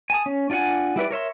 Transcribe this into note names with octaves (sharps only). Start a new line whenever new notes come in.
G#5 A5 D#6
C#4
D4 F4 D5 F#5 G#5
G3 E4 B4 D5
A#4 C#5 E5 C6